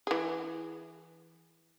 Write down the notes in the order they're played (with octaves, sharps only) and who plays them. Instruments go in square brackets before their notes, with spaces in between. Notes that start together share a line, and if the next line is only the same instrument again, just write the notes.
[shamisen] E3 G#4